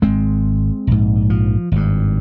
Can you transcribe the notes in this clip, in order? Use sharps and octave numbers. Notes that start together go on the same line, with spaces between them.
G#1 G#2 G#3 C4
A#1 G#2
F3
G#1 G2